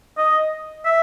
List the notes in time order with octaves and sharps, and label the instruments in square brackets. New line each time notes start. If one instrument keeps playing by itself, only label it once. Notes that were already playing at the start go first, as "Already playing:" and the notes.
[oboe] D#5
E5